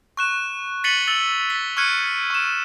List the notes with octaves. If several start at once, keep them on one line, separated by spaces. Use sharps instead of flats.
C#6 F#6 E7
A6 B6 C#7 D#7 F#7 G7
E6 A6 F#7 G7
B6
C#6 F6 F#6 G#6 C#7 D#7
C#6 E7